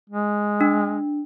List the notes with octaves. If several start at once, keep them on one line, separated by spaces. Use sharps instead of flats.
G#3
D4